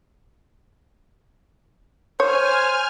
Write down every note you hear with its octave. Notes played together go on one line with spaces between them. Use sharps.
C5 C#5 G#5 F6